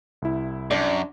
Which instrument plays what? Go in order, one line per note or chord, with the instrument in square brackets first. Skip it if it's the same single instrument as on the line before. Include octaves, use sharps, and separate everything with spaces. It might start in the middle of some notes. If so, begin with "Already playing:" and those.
[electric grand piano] C2 E4
[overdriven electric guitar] F#2 [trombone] D4 [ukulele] D5